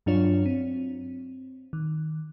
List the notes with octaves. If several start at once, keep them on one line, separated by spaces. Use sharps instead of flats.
G2 F#3 D4 F4 C#5
C4
D#3